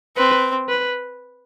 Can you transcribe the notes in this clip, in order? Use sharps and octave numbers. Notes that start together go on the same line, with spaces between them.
C4 B4
B4